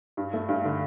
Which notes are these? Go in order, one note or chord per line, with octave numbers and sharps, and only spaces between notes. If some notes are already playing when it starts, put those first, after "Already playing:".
G2
A3
G2
D3